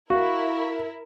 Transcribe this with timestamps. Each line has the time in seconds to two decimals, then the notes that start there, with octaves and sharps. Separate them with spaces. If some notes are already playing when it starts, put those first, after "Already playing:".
0.10 E4 F#4 A#4 F5 C#6